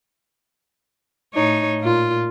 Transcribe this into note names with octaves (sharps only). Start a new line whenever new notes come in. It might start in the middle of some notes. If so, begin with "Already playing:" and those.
A2 D#4 C#5
A#2 F4